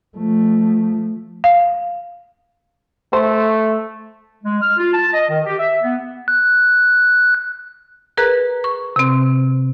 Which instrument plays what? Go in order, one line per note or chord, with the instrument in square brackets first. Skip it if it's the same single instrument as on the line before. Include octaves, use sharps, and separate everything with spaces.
[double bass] F3 A3
[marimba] F5
[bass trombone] A3 [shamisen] C5
[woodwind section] G#3
F6
F4
A5
D#5
D#3
G4
E5
B3
[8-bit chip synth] F#6
[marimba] G#4 A#4 B4 A#5 F#6
C#6
C3 C4